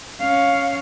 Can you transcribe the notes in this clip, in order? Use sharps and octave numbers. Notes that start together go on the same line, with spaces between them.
C#4 F5